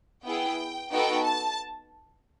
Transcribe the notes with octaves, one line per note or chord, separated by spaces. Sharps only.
B3 E4 G#4 G5
B3 D#4 F#4 A4 G5
A5